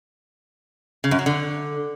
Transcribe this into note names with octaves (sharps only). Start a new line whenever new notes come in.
C#3
F#2
F#3
D3